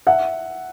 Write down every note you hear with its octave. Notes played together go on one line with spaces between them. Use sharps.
E5 F#5